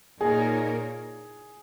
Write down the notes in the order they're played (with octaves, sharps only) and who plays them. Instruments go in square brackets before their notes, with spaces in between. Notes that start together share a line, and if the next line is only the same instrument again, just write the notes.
[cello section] A#2 A#3 D#4 A#4 C#5 [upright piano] G#4